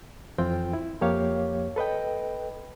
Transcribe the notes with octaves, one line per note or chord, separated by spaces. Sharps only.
F2 E3 C4 F4 G5
E4
F2 F3 A#3 G4 C#5 F5
A4 B4 D#5 G5